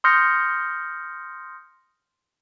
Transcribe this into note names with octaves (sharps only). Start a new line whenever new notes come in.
C6 D#6 F6 G6 A#6 C#7